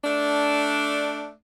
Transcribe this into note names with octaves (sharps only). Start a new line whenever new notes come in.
A3 D4